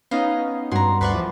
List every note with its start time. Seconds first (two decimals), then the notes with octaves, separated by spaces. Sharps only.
0.11 B3 C#4 D#4 D#5 F5
0.71 G2 F#4 A#5 C6
1.01 D2 B4 D5 F#5 C6 C#6
1.13 E3 F3